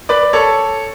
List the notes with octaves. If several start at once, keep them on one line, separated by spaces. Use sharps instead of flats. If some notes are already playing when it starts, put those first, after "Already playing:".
B4 D5
A4 C#5